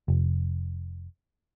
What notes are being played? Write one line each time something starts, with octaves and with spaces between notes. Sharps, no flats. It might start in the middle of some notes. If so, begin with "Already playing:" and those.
F1